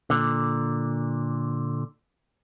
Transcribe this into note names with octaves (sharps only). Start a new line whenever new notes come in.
A#2 D3